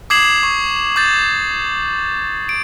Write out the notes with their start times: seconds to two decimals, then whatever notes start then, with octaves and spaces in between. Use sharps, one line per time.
0.10 D6 D#6 G#6 C7 E7 F#7
0.43 C#6
0.96 D6 G6 A6
2.49 D7